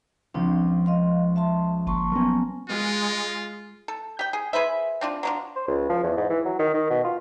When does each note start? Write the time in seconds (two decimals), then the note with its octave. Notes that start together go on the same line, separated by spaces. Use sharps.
0.34 C#2 F3 C4 D4 C5
0.86 D#5 F5 C6
1.36 E5 A5 C6
1.87 G1 A#3 A5 C6 C#6
2.12 F#3 B3 C#4 A#4
2.69 G#3 F4
3.88 A4
4.19 G4 G5
4.33 G#4
4.53 G#4 B4 C5 E5
5.01 C4 D4 F4
5.23 F#3 D4 F4
5.56 C5
5.68 C#2
5.89 F3
6.03 E2
6.17 G#2
6.30 E3
6.45 F#3
6.59 D#3
6.74 D#3
6.90 B2
7.05 F4